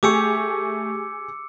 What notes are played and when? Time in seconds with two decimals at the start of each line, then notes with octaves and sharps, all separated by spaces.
0.03 A3 G4 G#4 C#6 D6 E6 C#7